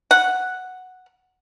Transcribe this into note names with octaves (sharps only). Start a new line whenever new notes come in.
F#5